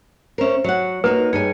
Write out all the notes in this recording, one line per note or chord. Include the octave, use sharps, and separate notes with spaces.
C#4 A#4 C5 E5
F#3 C#5 F#5
A#3 D#4 F#4 B4
G2 D#4 G#4 C#5 G#5